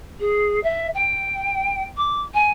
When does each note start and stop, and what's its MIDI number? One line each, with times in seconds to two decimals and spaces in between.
0.20 0.60 68
0.63 0.87 76
0.95 1.84 79
1.97 2.21 86
2.34 2.52 80